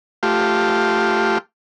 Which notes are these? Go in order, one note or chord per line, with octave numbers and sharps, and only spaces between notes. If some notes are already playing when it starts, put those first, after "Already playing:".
A3 F4 G4